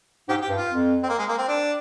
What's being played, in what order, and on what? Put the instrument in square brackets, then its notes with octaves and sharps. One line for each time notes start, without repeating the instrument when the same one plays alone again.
[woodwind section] G#2 [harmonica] G4
[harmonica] G4
[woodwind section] G2
[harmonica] F4
[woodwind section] F2
[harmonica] C4
A#3
G#3
A#3
C4
D4